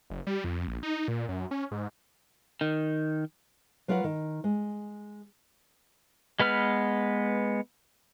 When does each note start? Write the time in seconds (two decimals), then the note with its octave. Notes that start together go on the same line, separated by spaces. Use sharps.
0.10 F#1
0.27 G3
0.44 F2
0.68 A#1
0.83 D#4
1.08 A#2
1.29 F#2
1.51 C#4
1.71 G#2
2.61 D#3
3.88 F#3 F4 A#4 B4 F#5
4.04 D#3
4.44 G#3
6.39 G#3 B3 B4 F6